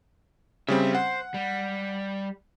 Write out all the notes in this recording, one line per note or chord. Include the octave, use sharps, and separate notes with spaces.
C#3 G3 C4 E5
C5 F#5
G3